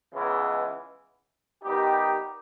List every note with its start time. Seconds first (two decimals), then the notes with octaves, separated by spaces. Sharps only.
0.12 C#2 C#3 E3 G#3 B3
1.63 D#3 G3 B3 D#4 G4